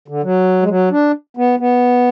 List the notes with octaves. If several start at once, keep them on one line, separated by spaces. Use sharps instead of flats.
D3
F#3
G#3
F#3
D4
B3
B3